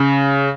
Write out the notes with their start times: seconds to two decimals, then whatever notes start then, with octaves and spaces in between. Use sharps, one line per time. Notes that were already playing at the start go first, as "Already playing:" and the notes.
Already playing: C#3